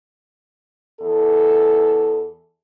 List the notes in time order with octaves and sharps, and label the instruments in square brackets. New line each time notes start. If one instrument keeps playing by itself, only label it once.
[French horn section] E2 E3 A4